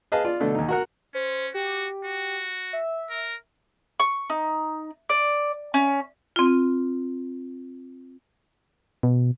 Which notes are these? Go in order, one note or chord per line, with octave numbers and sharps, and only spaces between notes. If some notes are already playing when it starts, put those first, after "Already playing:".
G#4 B4 D#5 F5 A5
F4 D5
B2 D3 A3
D#2 D#4
F#4 A#4 F#5
C#4 C5
F#4 G4
F#4
E5
A#4
C#6
D#4
D5
C#4
C4 F4
B2